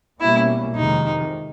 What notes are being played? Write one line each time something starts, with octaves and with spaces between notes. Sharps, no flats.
B2 G3 A#3 C#4 E4
F2 C3 D#3 G#3 D#4